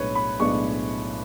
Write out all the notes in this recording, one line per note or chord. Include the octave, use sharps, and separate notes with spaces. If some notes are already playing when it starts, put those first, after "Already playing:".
Already playing: B1 A2 G#3 B3 D4 B4 C#5
B5
B1 A2 G#3 B3 D4 C#6